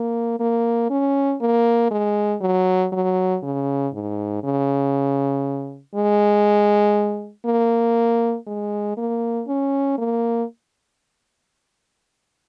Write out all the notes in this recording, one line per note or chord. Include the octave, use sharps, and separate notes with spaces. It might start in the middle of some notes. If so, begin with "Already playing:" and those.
Already playing: A#3
A#3
C#4
A#3
G#3
F#3
F#3
C#3
G#2
C#3
G#3
A#3
G#3
A#3
C#4
A#3